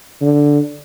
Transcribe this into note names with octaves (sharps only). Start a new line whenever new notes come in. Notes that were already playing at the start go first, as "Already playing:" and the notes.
D3